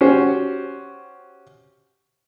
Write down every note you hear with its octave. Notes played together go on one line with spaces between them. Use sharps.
C#4 F#4 G4 C5